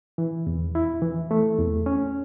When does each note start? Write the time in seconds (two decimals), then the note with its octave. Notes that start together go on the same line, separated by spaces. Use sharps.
0.18 E3
0.47 E2
0.75 E4
1.02 E3
1.31 A3
1.58 E2
1.86 C#4